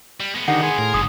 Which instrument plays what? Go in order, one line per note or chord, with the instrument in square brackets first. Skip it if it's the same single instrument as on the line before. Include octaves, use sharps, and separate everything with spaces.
[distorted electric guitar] G3
G#3 B3
[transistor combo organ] D3 D#4 G4 [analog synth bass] D#3 [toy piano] F#5
[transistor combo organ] G#4 C6
[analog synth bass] A2 [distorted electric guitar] A#4
[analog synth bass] F#1 [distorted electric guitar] G#2 D3 [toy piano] D#6